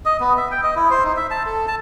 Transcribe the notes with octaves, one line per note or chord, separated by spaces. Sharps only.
D#5
B3
E5
G5
D#5
E4
C5
D#4
E5
A5
A4
A5